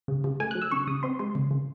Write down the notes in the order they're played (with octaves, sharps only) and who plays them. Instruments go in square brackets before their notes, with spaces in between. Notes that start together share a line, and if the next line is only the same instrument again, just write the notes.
[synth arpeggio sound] C#3
C#3
A3 G#5
F#3 F#6
E6
C#3 C#6
C#3 D#6
C4 C6
G#3 C6
C#3
C#3